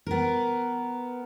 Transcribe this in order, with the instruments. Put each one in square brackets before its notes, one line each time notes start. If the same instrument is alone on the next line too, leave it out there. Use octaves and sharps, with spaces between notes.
[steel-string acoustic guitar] B3 A#4